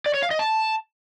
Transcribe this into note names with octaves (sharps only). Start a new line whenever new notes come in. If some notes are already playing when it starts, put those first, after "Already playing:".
D5
C#5
F5
D#5
A5